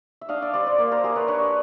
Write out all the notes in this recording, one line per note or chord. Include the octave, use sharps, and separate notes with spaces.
E5
D4 D#5 F5
D5 E5
G3 C5 D5
C5 D5
A#3
A#4 C5
G3 G#4 A#4
B4 C#5
D4 B4 C#5